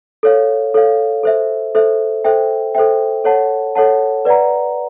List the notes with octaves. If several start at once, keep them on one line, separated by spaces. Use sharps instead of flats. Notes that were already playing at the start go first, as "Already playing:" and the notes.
A4 C#5 F5
A4 C#5 F5
A4 C5 E5
A4 C5 E5
A4 C5 E5 G5
A4 C5 E5 G5
A4 C#5 F#5 A5
A4 C#5 F#5 A5
B4 D5 F#5 A#5